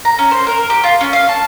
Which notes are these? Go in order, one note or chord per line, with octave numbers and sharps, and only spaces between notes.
A#5
C#4
C5
A#4
G4
F4
C#4
F5
A5